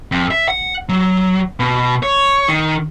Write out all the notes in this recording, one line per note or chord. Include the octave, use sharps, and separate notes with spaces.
F2
E5
F#5
F#3
B2
C#5
D#3